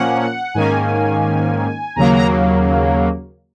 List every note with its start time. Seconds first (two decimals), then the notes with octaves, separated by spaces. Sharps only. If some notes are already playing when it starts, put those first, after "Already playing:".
Already playing: A#2 F3 A#3 C#4 F#5
0.54 G#2 D#3 A#3 C#4 G#5
1.96 D#2 C#3 F#3 A#3 A#5
2.14 A#5